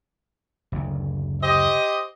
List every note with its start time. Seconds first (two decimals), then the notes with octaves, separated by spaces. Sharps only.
0.72 F#1 D2
1.42 G4 C5 D#5